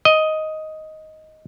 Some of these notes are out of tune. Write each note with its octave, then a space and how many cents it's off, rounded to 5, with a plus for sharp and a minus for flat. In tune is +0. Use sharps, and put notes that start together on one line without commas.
D#5 +5